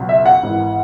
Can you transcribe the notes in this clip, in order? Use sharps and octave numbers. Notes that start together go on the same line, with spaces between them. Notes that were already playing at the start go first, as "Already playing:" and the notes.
Already playing: C#2 B2 F#3
E5
F#5
G#1 G#2 E3